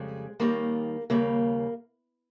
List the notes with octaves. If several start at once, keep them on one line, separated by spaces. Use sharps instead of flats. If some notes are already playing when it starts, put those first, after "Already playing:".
Already playing: F2 C#3 G3 G#3
D#2 D#3 G3 A#3
D#2 C#3 G3 A#3